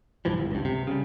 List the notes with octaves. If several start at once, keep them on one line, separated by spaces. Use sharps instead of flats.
B1 G2 E3 F3
G1
C#2 G2
C3
C#3 G3